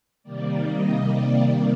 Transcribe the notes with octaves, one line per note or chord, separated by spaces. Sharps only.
C3 D#3 G3 A#3 D5
D#5
D5